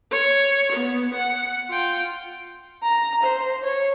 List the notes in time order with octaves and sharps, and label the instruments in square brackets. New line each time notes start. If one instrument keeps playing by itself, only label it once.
[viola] C#5
B3
F#5
F4 G5
[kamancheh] A#5
C5
C#5